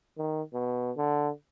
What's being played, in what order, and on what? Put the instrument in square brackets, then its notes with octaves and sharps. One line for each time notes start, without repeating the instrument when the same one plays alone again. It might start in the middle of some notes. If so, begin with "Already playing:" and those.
[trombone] D#3
B2
D3